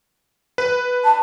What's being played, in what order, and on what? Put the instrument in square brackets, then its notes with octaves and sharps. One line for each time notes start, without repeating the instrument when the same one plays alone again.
[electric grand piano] B4
[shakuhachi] A5